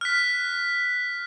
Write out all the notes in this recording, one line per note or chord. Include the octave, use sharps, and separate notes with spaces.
F6 F#6 B6